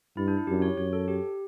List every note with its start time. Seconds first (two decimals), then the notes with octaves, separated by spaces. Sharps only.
0.17 G2 E4
0.28 D4
0.37 E4
0.47 F#2 G4
0.62 C#5
0.77 F#2 C#5
0.93 A4
1.08 G4